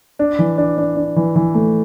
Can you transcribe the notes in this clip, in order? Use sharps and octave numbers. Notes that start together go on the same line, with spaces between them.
D4
E3
D4
D4
D4
E3
E3
A3